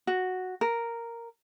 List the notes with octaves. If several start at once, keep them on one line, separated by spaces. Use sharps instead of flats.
F#4
A#4